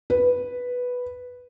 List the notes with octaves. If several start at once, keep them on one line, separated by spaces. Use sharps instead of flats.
B4